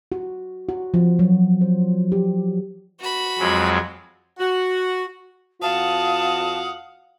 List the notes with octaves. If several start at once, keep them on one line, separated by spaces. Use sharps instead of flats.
F#4
F#4
F3
F#3
C5
G4
F#4 B5
F2 F#3 G#3
F#4
F2 F4 F#4 F5 F#5 A5 D#6